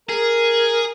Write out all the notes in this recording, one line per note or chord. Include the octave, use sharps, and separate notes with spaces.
G#4 A#4